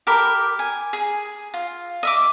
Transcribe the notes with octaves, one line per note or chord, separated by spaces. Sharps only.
G4 A4 A#4 B5
G#5
G#4
F4
D#5 E5 D6